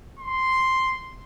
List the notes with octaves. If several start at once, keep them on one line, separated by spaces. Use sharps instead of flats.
C6